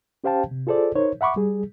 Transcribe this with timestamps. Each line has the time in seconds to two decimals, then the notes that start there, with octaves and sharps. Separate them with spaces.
0.24 C#4 G4 C5 F5 G5 A5
0.51 C3
0.67 F4 G#4 A4 C5 D5
0.95 D#4 A#4 C5 C#5
1.21 E5 F#5 B5 C#6 D6
1.36 G3 G#4